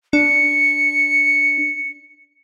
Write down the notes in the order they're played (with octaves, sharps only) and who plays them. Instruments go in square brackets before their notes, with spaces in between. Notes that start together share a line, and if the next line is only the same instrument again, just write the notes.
[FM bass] D4 [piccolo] C#7